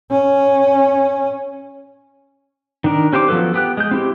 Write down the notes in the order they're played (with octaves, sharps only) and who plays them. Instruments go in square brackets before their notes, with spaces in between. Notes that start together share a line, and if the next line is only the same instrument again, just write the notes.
[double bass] C#4
[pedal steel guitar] D#3 D4 A#4
C#4 G4 C5 E5 D6
F3 F#3 B3 A4 B4
B3 G4 F#6
G#3 G6
C4 E4 G4